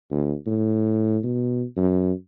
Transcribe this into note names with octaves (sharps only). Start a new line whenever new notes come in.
D2
A2
B2
F#2